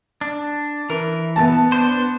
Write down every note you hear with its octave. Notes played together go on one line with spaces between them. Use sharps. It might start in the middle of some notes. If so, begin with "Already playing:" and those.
D4
E3 A#4
B3 A5
D4 C5